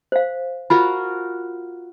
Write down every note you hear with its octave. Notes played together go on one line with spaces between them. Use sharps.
C5 F5
F4 F#4 A#4 B5